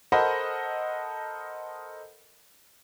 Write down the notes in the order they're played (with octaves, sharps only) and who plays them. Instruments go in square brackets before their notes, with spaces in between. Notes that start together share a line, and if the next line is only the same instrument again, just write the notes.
[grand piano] A4 A#4 C5 D#5 F#5 B5